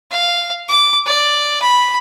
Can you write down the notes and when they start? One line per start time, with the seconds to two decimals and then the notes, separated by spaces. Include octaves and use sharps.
0.11 F5
0.69 D6
1.06 D5
1.62 B5